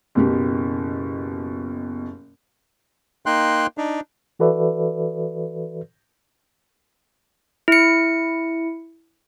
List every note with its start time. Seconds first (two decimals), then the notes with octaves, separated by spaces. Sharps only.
0.15 F#1 B2 G4
3.26 A#3 D#4 G5 C6 F#6
3.78 D4 D#4
4.39 E3 F#4 A4 B4 D5 E5
7.68 E4 C#7